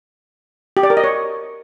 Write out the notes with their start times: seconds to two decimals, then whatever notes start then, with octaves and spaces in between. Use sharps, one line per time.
0.77 G4
0.83 D5
0.90 A#4
0.97 D#5
1.04 C#5